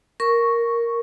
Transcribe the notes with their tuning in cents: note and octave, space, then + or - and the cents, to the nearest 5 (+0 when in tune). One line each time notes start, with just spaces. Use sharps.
A#4 +0 C#6 +0